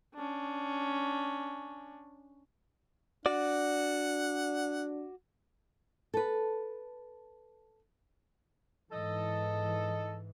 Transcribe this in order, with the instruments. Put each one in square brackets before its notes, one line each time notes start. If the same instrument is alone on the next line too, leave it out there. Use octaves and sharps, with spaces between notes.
[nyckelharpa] C#4 D4
[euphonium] D4 [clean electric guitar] F#4 D5 [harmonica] F#5
[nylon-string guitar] A4 B4
[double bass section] G#2 E3 [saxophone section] A4 D#5